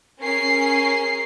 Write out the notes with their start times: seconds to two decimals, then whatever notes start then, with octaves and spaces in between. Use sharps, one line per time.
0.21 C#4 G#4 A#4 C7